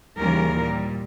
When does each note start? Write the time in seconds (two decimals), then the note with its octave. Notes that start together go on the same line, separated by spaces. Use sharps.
0.17 D#2 C#3 E3 G3 A#4
0.54 A#2 G3